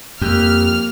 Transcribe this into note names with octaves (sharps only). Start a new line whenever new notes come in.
F2 A#3 G4 F6